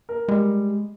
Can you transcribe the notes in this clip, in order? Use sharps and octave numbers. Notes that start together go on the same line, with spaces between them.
A#4
G3 G#3